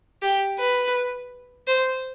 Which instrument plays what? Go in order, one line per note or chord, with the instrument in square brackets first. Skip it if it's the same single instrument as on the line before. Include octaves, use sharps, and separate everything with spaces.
[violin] G4
B4
C5